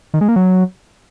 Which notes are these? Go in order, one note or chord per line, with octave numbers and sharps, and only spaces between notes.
D#3
G#3
A#3
F#3